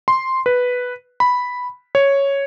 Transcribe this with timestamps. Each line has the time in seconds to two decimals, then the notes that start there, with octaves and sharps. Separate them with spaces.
0.08 C6
0.46 B4
1.20 B5
1.95 C#5